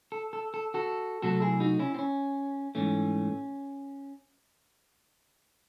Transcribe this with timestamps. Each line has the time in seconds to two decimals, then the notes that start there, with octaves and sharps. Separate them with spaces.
0.12 A4
0.33 A4
0.54 A4
0.74 F#4 A4
1.23 C3 F#3 A3 F#4 A4
1.41 E4 G#4
1.60 D#4 F#4
1.79 C#4 E4
1.94 C4
1.99 C#4
2.75 G#2 E3 A3 C#4